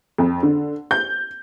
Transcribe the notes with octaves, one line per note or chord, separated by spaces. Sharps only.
F2
D3
G6